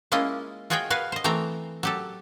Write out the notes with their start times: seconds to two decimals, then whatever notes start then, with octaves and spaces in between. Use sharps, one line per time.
0.12 G#3 A#3 C#4 E4 F4 D#5
0.70 F4 F#4 G#4 C#5 D#5 G5
0.90 F#4 B4 F5 G#5
1.12 C5 D#5
1.24 E3 A3 C4 G5 A#5
1.83 F#3 G4 A4